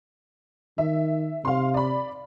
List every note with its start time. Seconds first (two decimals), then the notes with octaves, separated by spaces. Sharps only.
0.78 D#3 E5
1.45 C3 F5 C6
1.74 D5 B5